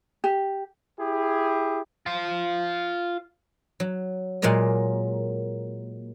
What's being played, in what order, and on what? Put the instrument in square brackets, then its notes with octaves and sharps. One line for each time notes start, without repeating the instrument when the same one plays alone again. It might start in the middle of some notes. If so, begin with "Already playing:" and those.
[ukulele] G4
[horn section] E4 G4 G#4
[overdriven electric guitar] F4 C5
[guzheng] F#3
A#2 F#3 G#3 A#3 D#5